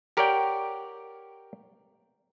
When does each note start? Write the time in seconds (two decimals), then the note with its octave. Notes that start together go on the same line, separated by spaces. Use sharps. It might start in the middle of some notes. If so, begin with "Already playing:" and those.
0.17 G4 A#4 C#5 D5 F#5 G5